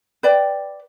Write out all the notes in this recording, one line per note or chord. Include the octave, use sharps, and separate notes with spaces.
B4 D5 G5